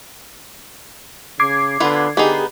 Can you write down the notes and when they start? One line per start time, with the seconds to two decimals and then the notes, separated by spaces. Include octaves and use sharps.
1.39 C#3 D6 G#6 C7
1.80 D3 B3 F4 B4
2.17 D3 B3 D#4 G4 G#4